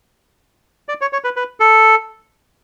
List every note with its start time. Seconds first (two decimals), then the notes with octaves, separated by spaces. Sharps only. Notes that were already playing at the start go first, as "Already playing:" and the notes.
0.89 D5
1.01 C#5
1.13 C#5
1.24 B4
1.36 B4
1.60 A4